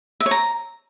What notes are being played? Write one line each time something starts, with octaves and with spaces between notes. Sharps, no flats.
E5
C#5
A#5